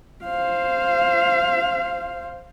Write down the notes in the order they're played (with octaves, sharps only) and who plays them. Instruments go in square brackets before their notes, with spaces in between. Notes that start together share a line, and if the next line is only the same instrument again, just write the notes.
[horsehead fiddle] C5 F5